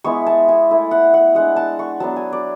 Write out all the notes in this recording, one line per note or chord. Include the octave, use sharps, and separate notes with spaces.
G#3 B3 E4 C#6
A5
G#5
A3 E4
F#5
F#5
G#3 D4 F#5
A5
C#6
F#3 B3 D4 A5
G#5
D5